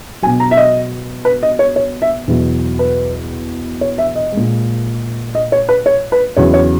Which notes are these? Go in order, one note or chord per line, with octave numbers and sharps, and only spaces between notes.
B2 F#3 G#5
A#5
E5
D#5
B4
D#5
C#5
C#5
E5
E2 B2 F#3
B4
C#5
E5
D#5
A#2 G#3
D#5
C#5
B4
C#5
B4
E2 C#3 F#3 C#5
C#5